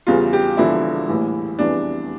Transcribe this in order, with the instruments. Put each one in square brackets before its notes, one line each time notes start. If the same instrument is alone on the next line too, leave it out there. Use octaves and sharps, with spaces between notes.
[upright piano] E2 C#3 E3 G3 F4
G4
E1 E2 D3 F3 E4
A#1 A2 E3 G3
F1 E2 E3 G3 D4